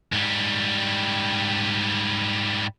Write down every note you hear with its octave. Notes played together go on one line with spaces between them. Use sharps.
G#2 G3